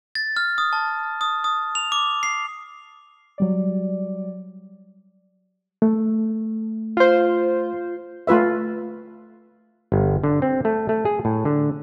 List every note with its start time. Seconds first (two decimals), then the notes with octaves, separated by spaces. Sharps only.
0.15 A6
0.37 F6
0.58 D#6
0.73 A5
1.21 D#6
1.44 D#6
1.75 F7
1.92 D6
2.23 C7
3.38 F#3 G3 D5
5.82 A3
6.97 F4 C5
8.27 A3 F4 B4 E5
9.92 G1
10.24 D3
10.42 C4
10.65 A3
10.89 A3
11.05 G#4
11.25 A2
11.45 D3